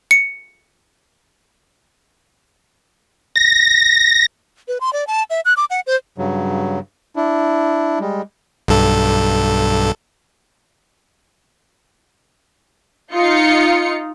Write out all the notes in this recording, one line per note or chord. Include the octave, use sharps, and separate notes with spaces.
C#7
A#6
B4
C6
D5
A5
E5
F#6
D6
F#5
C5
G2 C#3 F#3
D4 E4
G3 G#3
B1 G2 A4
D#4 F4 C#7